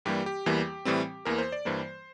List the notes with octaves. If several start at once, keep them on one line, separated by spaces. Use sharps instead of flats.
G2 E3 G3 A#3 G4
G4
E2 E3 G3 A#3
A2 E3 G3 C4
E2 E3 A#3 A#4
C5
D5
G2 E3 G3 A#3 C5